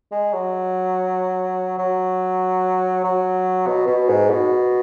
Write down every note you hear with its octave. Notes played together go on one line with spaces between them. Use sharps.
G#3
F#3
F#3
F#3
B2
B2
G#2
B2